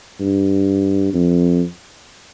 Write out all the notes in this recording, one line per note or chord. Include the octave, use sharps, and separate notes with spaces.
G2
F2